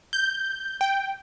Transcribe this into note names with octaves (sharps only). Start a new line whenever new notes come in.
G6
G5